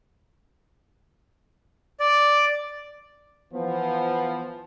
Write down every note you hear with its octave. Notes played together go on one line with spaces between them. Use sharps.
D5
E3 F3 B3